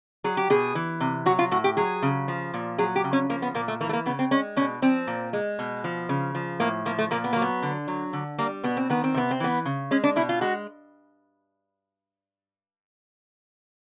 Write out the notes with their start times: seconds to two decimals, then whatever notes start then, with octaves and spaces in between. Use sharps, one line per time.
0.24 F#3 G#4
0.37 G4
0.50 B2 G#4
0.75 E3
1.01 C3
1.26 F#3 F#4
1.39 F4
1.51 A2 F#4
1.64 G4
1.77 F#3 G#4
2.02 C#3
2.28 F3
2.54 A#2
2.78 F#3 G#4
2.96 G4
3.04 C#3
3.13 C#4
3.29 F3 A#3
3.42 B3
3.55 A#2 A#3
3.68 A3
3.81 E3 A#3
3.89 A3
3.93 A#3
4.06 C#3 B3
4.19 C4
4.31 G#3 C#4
4.57 B2 C#4
4.82 F3 C4
5.07 A#2
5.33 G#3
5.59 B2
5.84 F3
6.09 C#3
6.35 F3
6.60 A2 A#3
6.86 F3 A#3
6.99 A3
7.11 A#2 A#3
7.24 B3
7.33 F#3 A#3
7.42 B3
7.62 D3
7.88 F#3
8.13 D3
8.38 G3 A#3
8.64 B2 B3
8.77 C4
8.90 D#3 B3
9.04 C4
9.14 C3 B3
9.31 C4
9.40 E3 B3
9.65 C#3
9.91 G#3 C#4
10.04 D4
10.16 B2 E4
10.29 F4
10.41 G#3 F#4